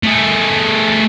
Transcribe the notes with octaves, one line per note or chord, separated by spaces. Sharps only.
A3 G#4